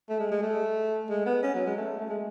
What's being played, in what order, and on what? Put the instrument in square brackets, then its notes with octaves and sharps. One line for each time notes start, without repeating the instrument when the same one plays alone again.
[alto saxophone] A3
G#3
G#3
A3
G#3
B3
C#4
F#3
G#3
A3
A3
G#3